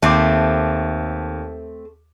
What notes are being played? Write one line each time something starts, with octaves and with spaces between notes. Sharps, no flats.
D#2 A3 C4 D6